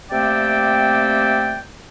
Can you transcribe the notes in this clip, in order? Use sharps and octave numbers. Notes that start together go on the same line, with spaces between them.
C3 A3 A#3 C4 D5 G5